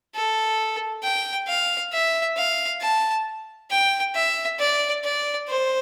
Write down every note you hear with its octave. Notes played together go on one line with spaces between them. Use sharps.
A4
G5
F5
E5
F5
A5
G5
E5
D5
D5
C5